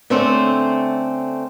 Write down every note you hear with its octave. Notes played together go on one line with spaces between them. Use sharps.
D3 A3 C4 C#4 C5